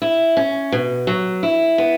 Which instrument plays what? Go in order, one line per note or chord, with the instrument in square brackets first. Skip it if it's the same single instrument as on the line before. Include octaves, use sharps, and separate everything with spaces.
[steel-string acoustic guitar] E4
C#4
B2
F#3
E4
B3